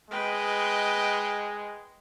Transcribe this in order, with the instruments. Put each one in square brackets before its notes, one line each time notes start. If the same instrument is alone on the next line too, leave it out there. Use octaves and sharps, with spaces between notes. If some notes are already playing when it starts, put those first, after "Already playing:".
[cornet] G#3 [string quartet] B4 D#5 G5